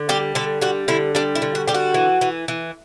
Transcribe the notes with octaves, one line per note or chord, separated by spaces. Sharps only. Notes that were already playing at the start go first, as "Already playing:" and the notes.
Already playing: D3
G3 G4
D3 A4
G3 F#4
D3 E4
G3 D4
E4
D3
F#4
G3 G4
F#4
E3
E3
E3